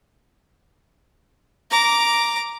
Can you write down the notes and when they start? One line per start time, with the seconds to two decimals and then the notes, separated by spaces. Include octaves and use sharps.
1.71 A#5 D6